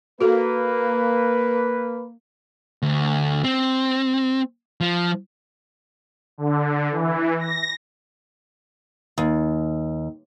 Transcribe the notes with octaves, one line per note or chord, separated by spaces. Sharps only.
A#3 F#4 A4 B4
D2
C4
F3
D3
E3
A#6
D#2